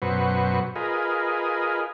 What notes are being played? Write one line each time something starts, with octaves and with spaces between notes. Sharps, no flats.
F#2 B2 F#3 B4 C5 C#6
F4 G#4 A#4 B4 D#5